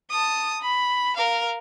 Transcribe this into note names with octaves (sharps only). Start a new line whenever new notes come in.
A5 D#6
B5
A#4 F5